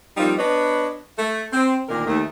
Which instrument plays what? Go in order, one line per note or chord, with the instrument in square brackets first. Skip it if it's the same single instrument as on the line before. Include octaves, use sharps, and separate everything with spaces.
[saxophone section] F3 G3 A#3 C4 D#4 F4
B3 D4 B4 C#5 D#5
A3
C4
D2 A#2 D#3 D4 A#4
D#2 D#3 A3